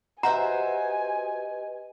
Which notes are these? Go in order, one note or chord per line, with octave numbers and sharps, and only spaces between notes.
F#4 G4 B4 C5 D#5 E5 G#5 A#5